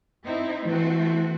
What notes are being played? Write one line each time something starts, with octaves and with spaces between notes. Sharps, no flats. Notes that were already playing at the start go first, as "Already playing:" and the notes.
C4 D#4 E4
E3 A3 C4 F#4